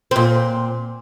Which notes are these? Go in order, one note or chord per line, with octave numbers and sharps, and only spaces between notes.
A#2 C4